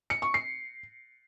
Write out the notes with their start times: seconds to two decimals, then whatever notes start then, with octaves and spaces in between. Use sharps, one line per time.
0.10 C#7
0.22 C#6
0.34 C7